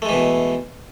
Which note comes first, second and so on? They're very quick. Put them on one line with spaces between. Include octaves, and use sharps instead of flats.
A3 G#3 E3 B2